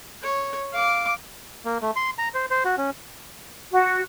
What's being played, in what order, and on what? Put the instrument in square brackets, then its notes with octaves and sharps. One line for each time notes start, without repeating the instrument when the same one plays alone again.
[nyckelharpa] C#5
F5 D6
[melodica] A#3
A3
C6
A#5
C5
C5
F#4
C#4
[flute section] F#4